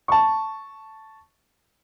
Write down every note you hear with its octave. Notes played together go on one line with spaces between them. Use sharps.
A5 C#6